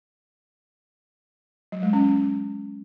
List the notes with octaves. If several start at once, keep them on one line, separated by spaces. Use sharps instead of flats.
F#3
G#3
C#4